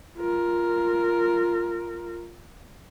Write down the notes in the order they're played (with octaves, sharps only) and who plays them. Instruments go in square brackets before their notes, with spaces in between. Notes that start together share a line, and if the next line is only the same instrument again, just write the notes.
[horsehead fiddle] F4 A#4